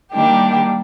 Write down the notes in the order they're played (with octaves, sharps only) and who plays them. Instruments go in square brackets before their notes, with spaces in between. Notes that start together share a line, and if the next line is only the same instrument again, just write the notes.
[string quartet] D#3 G3 A#3 D4 G4